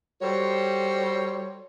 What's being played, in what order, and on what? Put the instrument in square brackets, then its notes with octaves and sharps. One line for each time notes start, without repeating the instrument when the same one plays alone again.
[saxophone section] G3 F#4 A4 C5 C#5